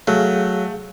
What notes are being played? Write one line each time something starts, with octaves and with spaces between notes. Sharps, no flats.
F#3 A3 G#4 F5